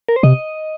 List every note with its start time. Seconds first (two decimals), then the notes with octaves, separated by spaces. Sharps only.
0.08 A#4
0.16 C5
0.23 C3 D#5